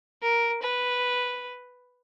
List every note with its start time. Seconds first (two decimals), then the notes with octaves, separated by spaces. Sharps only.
0.22 A#4
0.62 B4